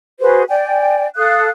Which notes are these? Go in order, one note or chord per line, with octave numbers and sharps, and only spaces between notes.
F#4 G#4 B4 C5
D5 G5 G#5
A4 F5 D#6 F#6